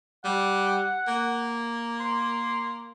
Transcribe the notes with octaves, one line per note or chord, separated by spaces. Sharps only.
G3 F#5
A#3
C6